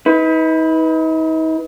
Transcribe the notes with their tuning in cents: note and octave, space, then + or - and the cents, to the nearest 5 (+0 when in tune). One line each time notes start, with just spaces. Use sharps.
D#4 +40 B4 +0